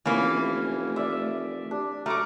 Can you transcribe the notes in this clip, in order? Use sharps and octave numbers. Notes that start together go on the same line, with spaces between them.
F1 E3 A3 A#3 C#4
D5 E5
D4 G4
F#3 A3 A#5 C#6 D6 F6